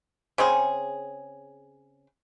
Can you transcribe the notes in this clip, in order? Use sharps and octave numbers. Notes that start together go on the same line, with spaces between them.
C#3 C4 G#4